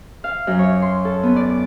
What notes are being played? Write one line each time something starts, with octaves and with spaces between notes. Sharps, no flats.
F5
F#2
C#5
C6
A4
B3
D5
D6